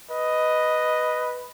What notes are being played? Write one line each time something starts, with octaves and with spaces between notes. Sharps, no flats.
B4 D#5